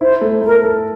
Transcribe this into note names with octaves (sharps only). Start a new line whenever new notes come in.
E4 C5
A3
A3 A#4
A4